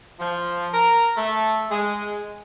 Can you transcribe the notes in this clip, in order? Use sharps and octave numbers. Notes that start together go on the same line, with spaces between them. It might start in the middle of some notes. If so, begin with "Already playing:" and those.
F3
A#4
A3
G#3